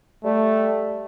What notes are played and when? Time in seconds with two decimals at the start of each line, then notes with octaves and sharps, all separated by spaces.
0.24 G3 A3